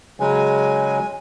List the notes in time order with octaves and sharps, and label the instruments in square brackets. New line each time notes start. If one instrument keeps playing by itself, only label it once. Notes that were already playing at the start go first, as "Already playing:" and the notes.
[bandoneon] C#3 F#3 G#3 [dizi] G#5